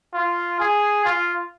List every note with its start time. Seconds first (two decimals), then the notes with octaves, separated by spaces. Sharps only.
0.14 F4
0.60 G#4
1.05 F4